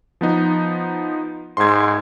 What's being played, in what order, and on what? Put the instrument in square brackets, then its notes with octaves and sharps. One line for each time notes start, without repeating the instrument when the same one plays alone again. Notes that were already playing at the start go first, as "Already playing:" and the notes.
[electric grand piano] F3 B3 D#4
[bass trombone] G#2 [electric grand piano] C6 G#6